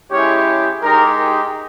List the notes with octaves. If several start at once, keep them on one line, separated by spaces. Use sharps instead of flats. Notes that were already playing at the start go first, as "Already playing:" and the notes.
G#3 C#4 E4 G4 C#5
G#3 D#4 G4 A#4